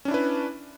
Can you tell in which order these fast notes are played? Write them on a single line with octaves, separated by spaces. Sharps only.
C#4 D4 E4 B4